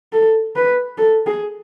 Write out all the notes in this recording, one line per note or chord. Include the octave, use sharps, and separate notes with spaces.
A4
B4
A4
G#4